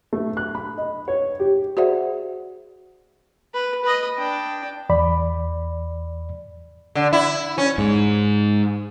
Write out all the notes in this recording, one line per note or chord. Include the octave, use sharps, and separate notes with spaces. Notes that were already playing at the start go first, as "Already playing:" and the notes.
A3
F#6
B5
D#5
C#5
G4
F#4 G#4 C5 D5 E5 F#5
B4
B4 D#5
D4 G5
E2 D5 B5
D3
E4
C#4
G#2